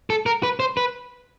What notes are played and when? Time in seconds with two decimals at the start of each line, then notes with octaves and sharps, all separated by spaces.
0.10 A4
0.26 A#4
0.43 B4
0.60 C5
0.77 B4